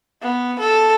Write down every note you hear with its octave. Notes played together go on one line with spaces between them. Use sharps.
B3
A4